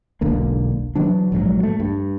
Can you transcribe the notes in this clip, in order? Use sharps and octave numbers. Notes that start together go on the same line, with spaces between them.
E1 B1 D3 A#3
E3 F#3 D4
A#1 G#2 C3 F#3
A3
G2